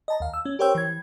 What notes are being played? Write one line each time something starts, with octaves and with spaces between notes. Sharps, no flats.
D#5 A5 A#5
D#2 F5
E6
C#4
G4 A#4 C5 C#5 G5 E6
E3 G#6